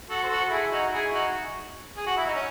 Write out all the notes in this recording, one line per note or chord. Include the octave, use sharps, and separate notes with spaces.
F#4 A4
C5
F#4 A4
E4 G#4
D#4 F#4
E4 G#4
D#4 F#4
G#4
F#4
E4
D#4
C#4